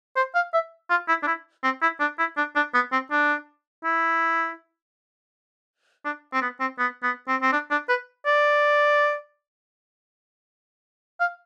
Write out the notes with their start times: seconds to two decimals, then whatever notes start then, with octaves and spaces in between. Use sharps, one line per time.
0.16 C5
0.35 F5
0.53 E5
0.90 F4
1.08 E4
1.23 D4
1.27 E4
1.64 C4
1.82 E4
2.00 D4
2.19 E4
2.37 D4
2.56 D4
2.74 B3
2.92 C4
3.11 D4
3.84 E4
6.05 D4
6.33 C4
6.42 B3
6.60 C4
6.79 B3
7.03 B3
7.28 C4
7.42 C4
7.52 D4
7.71 D4
7.89 B4
8.26 D5
11.20 F5